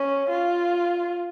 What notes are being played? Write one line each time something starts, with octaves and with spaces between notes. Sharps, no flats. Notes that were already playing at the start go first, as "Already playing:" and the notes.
Already playing: C#4
F4